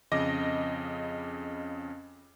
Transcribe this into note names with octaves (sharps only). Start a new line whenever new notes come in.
F2 C#3 D#5 D6 A#6